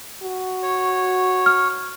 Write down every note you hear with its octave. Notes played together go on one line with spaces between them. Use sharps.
F#4
C#5
F6